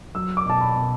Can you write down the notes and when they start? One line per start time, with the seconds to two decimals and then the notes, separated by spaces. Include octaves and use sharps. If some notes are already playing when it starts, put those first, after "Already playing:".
0.15 F#3 E6
0.37 D6
0.46 B2 A5
0.61 B5
0.76 B2